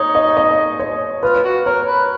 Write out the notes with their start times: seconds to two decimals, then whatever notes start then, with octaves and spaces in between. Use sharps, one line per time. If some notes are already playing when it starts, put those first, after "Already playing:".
Already playing: D#4 C#5
0.15 D#5
0.37 D#5
0.79 C#5
1.23 F4 B4
1.44 F#4
1.66 A#4 C#5
1.87 B4